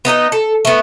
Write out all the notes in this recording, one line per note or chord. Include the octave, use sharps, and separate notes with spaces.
B3 D#4 G4 D#5
A4
A3 B3